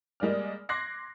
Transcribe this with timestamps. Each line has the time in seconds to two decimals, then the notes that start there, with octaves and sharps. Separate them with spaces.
0.20 G3 G#3 A#3 D5 F6
0.69 C6 D6 F#6 G#6 A#6 C7